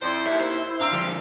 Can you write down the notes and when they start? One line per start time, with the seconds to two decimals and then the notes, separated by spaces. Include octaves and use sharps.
0.02 F2 E4 C5 D5
0.27 D#2 E5
0.41 C5
0.80 C4 D4 F5 A#5 E6
0.93 D3 F3